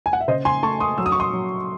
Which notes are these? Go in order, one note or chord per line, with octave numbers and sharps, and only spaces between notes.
G#5
F#5
E5
C#3 C5 D#5
G#5 C6
A3 A5 C#6
C6 D#6
F#3 E6
D#6
C#6
C6 D#6
F#3